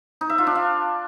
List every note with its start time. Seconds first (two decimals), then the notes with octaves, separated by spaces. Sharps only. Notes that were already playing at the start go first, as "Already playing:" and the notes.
0.21 D#4
0.30 E5
0.38 F4
0.47 D4
0.55 F5